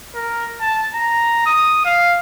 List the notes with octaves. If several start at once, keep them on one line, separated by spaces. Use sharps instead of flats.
A#4
A5
A#5
D#6
F5